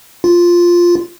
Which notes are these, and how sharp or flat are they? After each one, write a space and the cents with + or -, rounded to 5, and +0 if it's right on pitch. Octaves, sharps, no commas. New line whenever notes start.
F4 +0